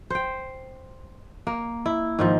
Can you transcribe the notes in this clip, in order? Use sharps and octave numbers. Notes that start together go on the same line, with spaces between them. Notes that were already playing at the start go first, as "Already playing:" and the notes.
C5 G5
A#3
E4
G#2 D#3 F3